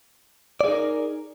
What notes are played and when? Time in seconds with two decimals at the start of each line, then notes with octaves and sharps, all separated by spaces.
0.61 D5
0.64 G#4
0.68 D#4
0.72 A#4